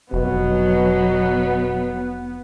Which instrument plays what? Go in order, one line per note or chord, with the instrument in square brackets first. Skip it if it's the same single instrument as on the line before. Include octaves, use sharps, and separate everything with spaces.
[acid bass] F1 [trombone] B2 [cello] F#3 [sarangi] B3